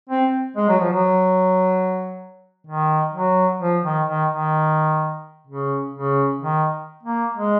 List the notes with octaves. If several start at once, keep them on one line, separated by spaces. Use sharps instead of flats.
C4
G#3
F#3
F3
F#3
D#3
F#3
F3
D#3
D#3
D#3
C#3
C#3
D#3
A#3
G#3